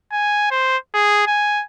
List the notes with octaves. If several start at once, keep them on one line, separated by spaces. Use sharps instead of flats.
G#5
C5
G#4
G#5